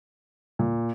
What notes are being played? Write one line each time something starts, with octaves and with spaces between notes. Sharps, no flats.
A#2